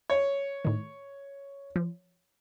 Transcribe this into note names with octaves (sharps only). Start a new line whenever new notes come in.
C#5
A2 D#3
F3